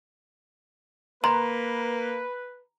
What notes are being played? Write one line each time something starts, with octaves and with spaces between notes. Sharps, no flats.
A#3 B4 A#5 C6